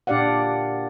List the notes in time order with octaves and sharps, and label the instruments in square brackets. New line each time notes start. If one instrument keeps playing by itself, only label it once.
[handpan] A#2 D4 G4 D5 F5 F#5